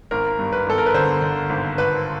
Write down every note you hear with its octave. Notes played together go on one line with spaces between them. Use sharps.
G#1 A#4
G2
B4
G#1 A4
A#4
B4
D3 C5
D3
G#1
G#1 B4